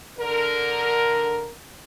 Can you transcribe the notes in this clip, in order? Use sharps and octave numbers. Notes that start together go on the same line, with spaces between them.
D3 A#4